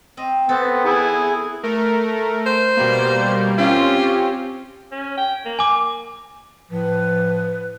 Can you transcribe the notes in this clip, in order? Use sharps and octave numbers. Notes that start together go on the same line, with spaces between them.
C4 D#5
B3 C4 A4
E4 G#4
A3 A#4
C5
B2 G3 A#3
C4 C#4 F4 G4
C#4
G5
A#3
G#5 D6
A2 F3 B4